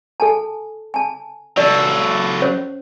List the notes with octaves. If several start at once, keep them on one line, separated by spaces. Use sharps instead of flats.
A4 G#5 A5
G#5 A5
F#3 A4 D5 D#5
C#4 C5 C#5